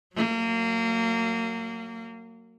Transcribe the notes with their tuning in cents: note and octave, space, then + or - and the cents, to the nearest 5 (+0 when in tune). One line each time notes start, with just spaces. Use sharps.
F#3 +0 A#3 -30